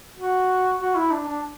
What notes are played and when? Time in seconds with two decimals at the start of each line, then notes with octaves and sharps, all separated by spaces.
0.16 F#4
0.80 F#4
0.95 E4
1.11 D4
1.28 D4